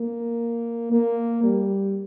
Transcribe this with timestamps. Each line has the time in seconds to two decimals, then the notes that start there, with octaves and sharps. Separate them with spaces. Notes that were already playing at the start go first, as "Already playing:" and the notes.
Already playing: A#3
0.92 A#3
1.43 G3